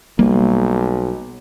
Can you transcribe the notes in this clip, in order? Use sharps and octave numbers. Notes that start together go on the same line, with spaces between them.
B1 G3 A#3